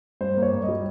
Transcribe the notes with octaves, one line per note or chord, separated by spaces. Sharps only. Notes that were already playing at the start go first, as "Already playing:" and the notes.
G2 C5
A#3
C#5
G2
D#5
G3